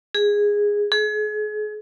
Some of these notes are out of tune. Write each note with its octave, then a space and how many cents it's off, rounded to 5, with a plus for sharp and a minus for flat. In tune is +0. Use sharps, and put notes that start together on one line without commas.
G#4 -10
G#4 +35